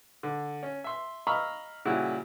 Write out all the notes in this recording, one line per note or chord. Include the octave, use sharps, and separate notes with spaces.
D3
C#4
E5 C6
D#5 F5 A#5 B5 C#6 E6
A#2 C#3 G3 E4 F#4